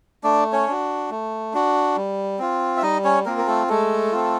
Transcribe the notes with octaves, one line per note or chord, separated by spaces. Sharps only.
A3 D4 D5
C#4 C#5
D4 F#4
A3
D4 F#4
G3
C4 F4
E5
G3 D#4 D#5
C#4 C#5
A#3 C4 F4 A#4
A#4
A3 A4
G#3 A3 A4
C4 F4